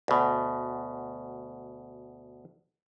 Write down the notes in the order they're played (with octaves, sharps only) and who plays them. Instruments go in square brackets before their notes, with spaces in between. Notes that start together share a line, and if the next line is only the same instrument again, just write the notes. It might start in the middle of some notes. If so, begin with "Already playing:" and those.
[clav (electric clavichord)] D2 B2